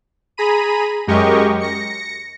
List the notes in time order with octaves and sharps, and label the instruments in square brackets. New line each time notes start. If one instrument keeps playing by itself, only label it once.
[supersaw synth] G#4 A#5 B5 D#7
F#2 G#3 G4 A#4 D#5 C#6
A#6 C#7